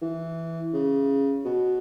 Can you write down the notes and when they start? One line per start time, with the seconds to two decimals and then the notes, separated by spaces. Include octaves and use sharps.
0.02 E3
0.74 C#3
1.45 B2